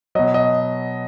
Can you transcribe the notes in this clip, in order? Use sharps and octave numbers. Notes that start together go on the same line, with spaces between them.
B2 F#3 D#5
D#5